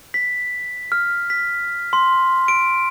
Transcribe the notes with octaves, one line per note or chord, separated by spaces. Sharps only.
B6
F6
B6
C6
D7